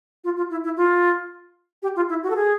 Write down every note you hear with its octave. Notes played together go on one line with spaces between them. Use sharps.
F4
F4
E4
E4
F4
G4
F4
E4
F#4
A4
G#4